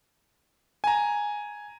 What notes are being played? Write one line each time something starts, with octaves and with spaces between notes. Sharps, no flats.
G#5 A#5